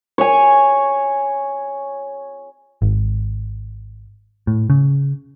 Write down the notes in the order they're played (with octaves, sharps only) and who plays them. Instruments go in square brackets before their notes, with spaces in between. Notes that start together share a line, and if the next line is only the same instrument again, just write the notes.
[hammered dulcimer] C#5 G#5
[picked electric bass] G#1
A2
C#3